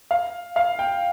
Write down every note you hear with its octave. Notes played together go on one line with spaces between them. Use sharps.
F5
F5
G5